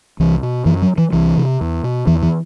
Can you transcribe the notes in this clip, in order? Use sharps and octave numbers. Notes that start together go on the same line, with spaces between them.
C2 E3
B2
F#2 E3
F#3
E3
C2 E3
C3
E2
B2
E2 E3
E3